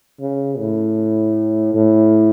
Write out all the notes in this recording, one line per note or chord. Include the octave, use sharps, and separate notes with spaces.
C#3
A2
A2